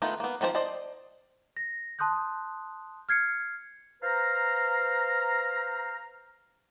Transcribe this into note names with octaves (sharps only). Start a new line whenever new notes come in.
D#3 A3 B3 D#4 F4
A#3 B3
D#3 F3 C4 D4 C5
C5 D5 D#5 A5
A#6
A5 C6 D#6 F#6 G6
F6 G#6 C7 C#7
B4 C5 F5 A#5